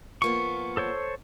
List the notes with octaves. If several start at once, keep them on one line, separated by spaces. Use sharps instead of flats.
F3 A#3 B3 C#6
A4 C5 C#5